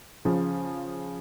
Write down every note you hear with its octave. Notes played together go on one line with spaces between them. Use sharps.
C#3 F3